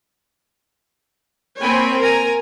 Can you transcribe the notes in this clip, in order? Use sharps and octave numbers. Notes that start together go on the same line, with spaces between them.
A#3 C4 C#5 G5 G#5 B5
A#4 G#5 A#5